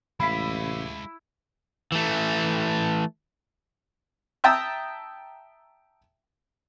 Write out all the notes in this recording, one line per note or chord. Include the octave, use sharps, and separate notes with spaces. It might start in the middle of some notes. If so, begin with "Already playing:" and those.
A1 G#3 E4 F5 B5 B6
E3 A3
E5 G5 A5 A#5 D#6 E6